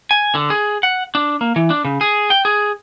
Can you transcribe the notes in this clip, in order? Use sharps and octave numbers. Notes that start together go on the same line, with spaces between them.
G#5
D3
G#4
F#5
D4
A#3
E3
D4
C#3
G#4
G5
G#4